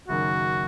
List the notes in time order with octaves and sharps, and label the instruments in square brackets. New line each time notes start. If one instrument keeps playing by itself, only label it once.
[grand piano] F#1 F#2 D#3 [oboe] F#4